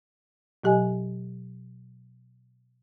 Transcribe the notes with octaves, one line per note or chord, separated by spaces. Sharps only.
B2 F#3 G4 D#5 G#5